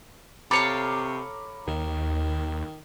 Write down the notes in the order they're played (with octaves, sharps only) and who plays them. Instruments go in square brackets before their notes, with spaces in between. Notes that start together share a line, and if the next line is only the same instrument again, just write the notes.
[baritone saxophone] C3 [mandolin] A4 C#5 F5 [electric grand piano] A#5 B5 D6
[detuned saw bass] D#2 [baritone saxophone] D#3